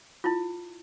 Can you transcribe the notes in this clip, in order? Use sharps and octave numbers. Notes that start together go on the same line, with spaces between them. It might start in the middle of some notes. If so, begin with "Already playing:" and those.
E4 F4